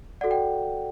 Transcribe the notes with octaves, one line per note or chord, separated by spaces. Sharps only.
F#4 A4 D5 F#5
G5